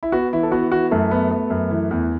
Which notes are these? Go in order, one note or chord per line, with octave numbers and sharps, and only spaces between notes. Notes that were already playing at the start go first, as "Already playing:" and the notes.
E4
B3 F#4
E3 E4
A4
B3 F#4
E3 F#4
F#2 A3 A4
B3
B3
F#2
E3
E2